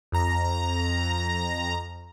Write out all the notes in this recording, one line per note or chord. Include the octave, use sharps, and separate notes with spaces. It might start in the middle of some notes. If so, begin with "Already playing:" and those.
F2 A#5